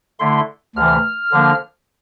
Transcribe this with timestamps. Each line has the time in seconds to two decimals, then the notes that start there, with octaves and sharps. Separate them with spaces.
0.19 D3 A3 E4 C6
0.75 D2 C3 E3 F6
1.31 D3 F3 A#3 D4